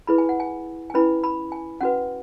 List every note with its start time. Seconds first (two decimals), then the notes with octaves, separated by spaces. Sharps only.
0.07 E4 G#4 B4 B5
0.18 G#5
0.29 F#5
0.40 G#5
0.90 G#5
0.94 C#4 E4 B4 B5
1.24 B5
1.52 G#5
1.81 C#4 F#4 B4 F#5